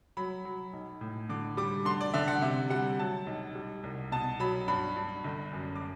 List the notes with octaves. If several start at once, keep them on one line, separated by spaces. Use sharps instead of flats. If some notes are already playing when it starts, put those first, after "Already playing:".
F#3 B5
F#3
B1
A2
D3 D6
G3 D6
D3 C6
D5
D3 E5
F#5
C3 E5
G3 F#5
F#3 A5
B1
G3
C2
B2 A5
F#3 B5
G2 B5
G2
G1
F#2
D6